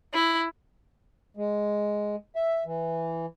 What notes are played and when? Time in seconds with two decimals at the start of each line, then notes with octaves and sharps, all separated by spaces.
0.14 E4
1.37 G#3
2.36 E5
2.65 E3